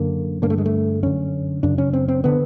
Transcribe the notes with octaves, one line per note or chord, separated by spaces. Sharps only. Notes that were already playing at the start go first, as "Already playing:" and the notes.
Already playing: F#2 D3 A#3
G2 D3 A#3
A3
G#3
A3
F#2 D3 C#4
F#2 C#3 D4
C#4
C4
C4
D3 B3